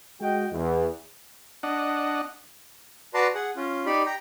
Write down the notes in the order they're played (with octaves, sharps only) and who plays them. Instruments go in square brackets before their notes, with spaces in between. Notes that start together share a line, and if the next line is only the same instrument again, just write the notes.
[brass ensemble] G#3 F#4 D#5 G5
E2
[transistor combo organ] D4 D#5 F#5
[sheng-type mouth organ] F#4 B4 D5 A5 A#5 C6
G#4 F#5
C#4 F4
D#4 G4 D5 B5
G5 A#5